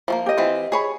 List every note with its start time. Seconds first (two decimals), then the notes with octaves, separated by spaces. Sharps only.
0.08 F3 A3 A#3
0.26 G4 D#5
0.37 E3 C4 F4
0.72 G#4 C#5 B5